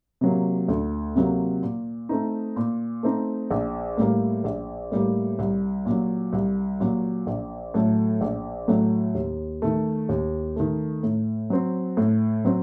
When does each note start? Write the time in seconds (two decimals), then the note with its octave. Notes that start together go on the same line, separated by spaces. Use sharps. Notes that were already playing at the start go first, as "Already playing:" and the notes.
0.21 C3 F#3 A#3
0.69 D2
1.16 C3 F#3 A#3
1.63 A#2
2.09 A3 C4 D#4
2.56 A#2
3.03 A3 C4 D#4
3.51 A#1
3.97 A2 G3 A#3
4.44 A#1
4.92 A2 G3 A#3
5.39 C2
5.86 A#2 F#3
6.33 C2
6.80 A#2 F#3
7.27 A#1
7.74 A2 F#3 A3
8.21 A#1
8.68 A2 F#3 A3
9.15 D#2
9.62 D#3 A3
10.09 D#2
10.56 D#3 A3
11.03 A2
11.50 F#3 C4
11.97 A2
12.45 F#3 C4